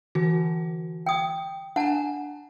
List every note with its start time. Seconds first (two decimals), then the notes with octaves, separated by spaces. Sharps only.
0.15 D3 E3 F#4
1.06 G5 D#6
1.76 D4 F#5 G#5 A5